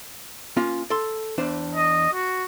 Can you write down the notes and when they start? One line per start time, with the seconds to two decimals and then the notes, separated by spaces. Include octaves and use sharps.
0.57 A#3 C#4 F4
0.90 A4 C6
1.38 E2 D4 C5
1.75 D#5
2.13 F#4